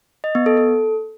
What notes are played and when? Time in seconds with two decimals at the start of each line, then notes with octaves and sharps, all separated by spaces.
0.24 D#5
0.35 B3
0.46 A4
0.57 A4